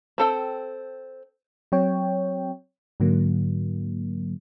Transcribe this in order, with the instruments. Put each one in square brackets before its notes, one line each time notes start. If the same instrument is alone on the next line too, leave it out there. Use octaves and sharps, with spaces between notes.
[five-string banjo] C4 A4 G5
[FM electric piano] F#3 C4 C#5 G5
G#2 D3 F#3 A#3